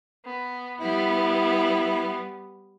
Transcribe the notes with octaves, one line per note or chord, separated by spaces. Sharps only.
B3
G3 B3 E4